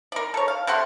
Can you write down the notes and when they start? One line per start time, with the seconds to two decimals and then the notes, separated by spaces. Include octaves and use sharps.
0.12 A#4 D5
0.34 A4 C#5
0.48 F5
0.67 C3 A4 F#5 C6